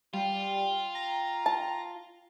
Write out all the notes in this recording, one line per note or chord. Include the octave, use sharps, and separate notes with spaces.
G3 F4 G5
A#5
A5